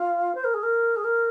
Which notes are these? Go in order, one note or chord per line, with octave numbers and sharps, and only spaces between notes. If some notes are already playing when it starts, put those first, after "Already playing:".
Already playing: F4
C5
A#4
G#4
A#4
G#4
A#4